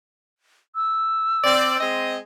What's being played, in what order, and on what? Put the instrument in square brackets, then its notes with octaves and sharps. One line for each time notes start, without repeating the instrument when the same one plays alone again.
[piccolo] E6
[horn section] C4 D5
G#3 C4 D#5